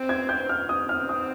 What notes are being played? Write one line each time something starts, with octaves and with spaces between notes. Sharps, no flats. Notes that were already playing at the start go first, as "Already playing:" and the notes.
Already playing: C4
G#6
G6
F6
C4 D#6
F6
D#6